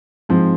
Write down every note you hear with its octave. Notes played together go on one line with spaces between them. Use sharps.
G#2 F3 C4